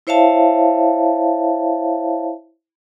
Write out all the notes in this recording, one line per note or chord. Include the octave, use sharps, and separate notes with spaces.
E4 C5 C#5 E5 F5 A5